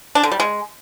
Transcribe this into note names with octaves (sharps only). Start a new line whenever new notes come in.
D4
D3
G3
G#3